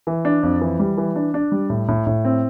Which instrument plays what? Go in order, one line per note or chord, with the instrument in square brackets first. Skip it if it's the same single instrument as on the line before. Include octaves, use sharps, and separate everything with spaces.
[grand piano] E3
D4
F2
E3
G3
E3
D4
D4
G3
A2
A2
A2
C4